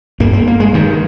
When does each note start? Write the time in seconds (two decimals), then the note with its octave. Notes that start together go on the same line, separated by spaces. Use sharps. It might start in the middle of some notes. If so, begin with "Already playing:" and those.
0.20 G2 A#3
0.33 A#3
0.47 A#3
0.60 G#3
0.73 G2 D#3